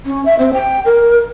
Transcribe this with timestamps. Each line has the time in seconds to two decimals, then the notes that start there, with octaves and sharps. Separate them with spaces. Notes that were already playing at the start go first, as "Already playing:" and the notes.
0.05 C#4
0.25 E5
0.38 C4
0.53 G5
0.85 A#4